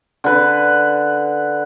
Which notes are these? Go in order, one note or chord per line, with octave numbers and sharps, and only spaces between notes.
D3 B4